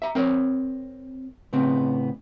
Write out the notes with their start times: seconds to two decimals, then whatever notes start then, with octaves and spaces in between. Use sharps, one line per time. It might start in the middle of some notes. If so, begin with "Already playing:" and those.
0.02 E5 A#5
0.15 C4 A#4 C#5
1.53 A2 C#3 B3 C4